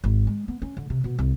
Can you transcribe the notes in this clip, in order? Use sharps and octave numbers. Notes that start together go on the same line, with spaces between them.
G#1
G#3
B3
C#4
D3
C3
B2
C2